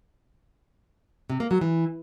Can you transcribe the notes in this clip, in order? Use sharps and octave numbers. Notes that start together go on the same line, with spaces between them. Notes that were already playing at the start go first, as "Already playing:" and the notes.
C3
A#3
F#3
E3